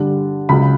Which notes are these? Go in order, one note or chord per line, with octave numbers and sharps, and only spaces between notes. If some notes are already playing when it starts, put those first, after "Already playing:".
Already playing: G2 D3 G3 D4
C#2 C#3 F#3 B5